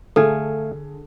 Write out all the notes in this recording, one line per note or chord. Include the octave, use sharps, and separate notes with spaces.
D3 A3 G#4 A4 F5 G#5